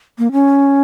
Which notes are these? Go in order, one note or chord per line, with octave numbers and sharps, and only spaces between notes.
A#3
C#4